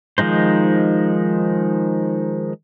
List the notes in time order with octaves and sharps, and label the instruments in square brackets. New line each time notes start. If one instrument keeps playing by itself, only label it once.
[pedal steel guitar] D#3 F3 G#3 D#4 C5